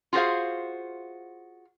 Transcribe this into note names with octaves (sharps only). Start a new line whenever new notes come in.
F4 F#4 G#4 C5 F5